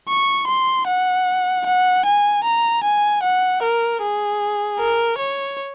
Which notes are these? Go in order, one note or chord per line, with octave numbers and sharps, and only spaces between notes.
C#6
C6
F#5
F#5
G#5
A#5
G#5
F#5
A#4
G#4
A#4
C#5